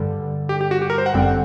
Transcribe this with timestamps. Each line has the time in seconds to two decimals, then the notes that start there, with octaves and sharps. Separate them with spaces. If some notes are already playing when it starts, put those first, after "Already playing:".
Already playing: G2 D3 G3
0.49 G4
0.61 G4
0.71 F#4
0.82 G4
0.90 A#4
0.98 C5
1.06 F#5
1.14 G1 F#2 D3 G3 C4 G5
1.22 F#5